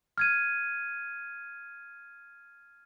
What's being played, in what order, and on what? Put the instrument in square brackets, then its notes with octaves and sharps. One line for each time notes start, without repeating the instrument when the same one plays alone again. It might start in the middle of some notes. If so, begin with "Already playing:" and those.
[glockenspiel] F6 G#6 D#7